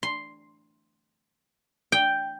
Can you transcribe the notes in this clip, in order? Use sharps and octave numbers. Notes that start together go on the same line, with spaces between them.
C6
G5